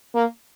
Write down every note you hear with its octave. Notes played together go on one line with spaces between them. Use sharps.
A#3